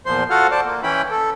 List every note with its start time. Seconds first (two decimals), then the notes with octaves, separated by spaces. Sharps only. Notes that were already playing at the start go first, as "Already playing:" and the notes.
0.06 E2 A#2 F3 C5 C6
0.30 F4 F#4 A4 F5 F#5 F6
0.51 C5 D5 A5
0.66 A#3
0.83 E3 C#4 E4 G5 B5
1.11 A4